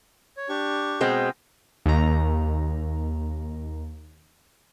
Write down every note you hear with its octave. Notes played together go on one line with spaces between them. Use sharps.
C#5
D4 G4 C#6
B2 G#3 C4 G5
D#2 A#5